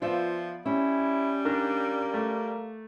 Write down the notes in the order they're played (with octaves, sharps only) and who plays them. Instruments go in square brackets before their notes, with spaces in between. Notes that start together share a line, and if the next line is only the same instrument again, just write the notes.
[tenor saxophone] F3 [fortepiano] B3 D5 [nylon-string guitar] F4 C5 E5
[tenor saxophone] G3 [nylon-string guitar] C#4 [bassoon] E4
[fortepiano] D#3 D4 A#4 [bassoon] A#3
[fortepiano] A3